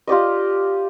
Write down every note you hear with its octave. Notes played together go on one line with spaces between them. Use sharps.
F4 G4 D5 D#5